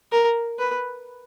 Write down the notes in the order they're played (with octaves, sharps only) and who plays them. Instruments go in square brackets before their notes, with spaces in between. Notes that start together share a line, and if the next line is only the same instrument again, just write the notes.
[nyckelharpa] A#4
B4